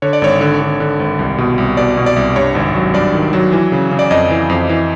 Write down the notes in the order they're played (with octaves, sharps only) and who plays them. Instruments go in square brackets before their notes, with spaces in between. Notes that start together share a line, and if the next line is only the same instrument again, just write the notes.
[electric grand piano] D3 C#5
D5
G#1 C#5
D3
D3
D3
G#1
C2
B2
C2
B2 D5
B2
D5
C2
G2 C#5
G#1
F#3
G2 D5
D#3
F#3
E3
C#3
C#3
D5
F2 D#5
E3
F2
E3